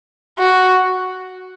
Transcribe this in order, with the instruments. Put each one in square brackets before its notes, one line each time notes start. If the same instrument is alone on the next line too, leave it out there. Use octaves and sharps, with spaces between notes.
[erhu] F#4